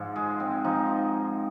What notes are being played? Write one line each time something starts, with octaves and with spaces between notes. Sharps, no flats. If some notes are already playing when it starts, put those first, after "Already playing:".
Already playing: G#2 F3
G#3
C4
F3 D#4